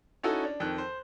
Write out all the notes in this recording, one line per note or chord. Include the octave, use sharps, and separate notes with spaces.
C#4 D#4 E4 F#4 A4
D4
F2 D#3 F#6
C5